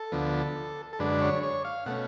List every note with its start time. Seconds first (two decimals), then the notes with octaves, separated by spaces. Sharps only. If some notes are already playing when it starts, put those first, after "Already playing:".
Already playing: A4
0.12 D2 D3 F3 B3
0.93 A4
0.99 F#2 D3 G#3 D4 B4
1.22 C#5
1.43 C#5
1.65 F5
1.86 B2 A3 C#4 F#5